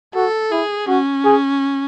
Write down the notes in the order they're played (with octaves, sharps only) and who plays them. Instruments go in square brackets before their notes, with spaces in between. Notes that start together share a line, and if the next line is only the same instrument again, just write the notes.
[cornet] F#4 [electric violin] A4
[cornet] E4 [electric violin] G#4
[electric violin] C#4 [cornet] F#4
[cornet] G#4